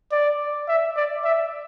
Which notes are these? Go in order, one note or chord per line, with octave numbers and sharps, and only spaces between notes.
D5
E5
D5
E5